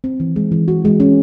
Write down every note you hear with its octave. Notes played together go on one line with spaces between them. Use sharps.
C4
E3
G#3
E3
F#4
G#3
C#4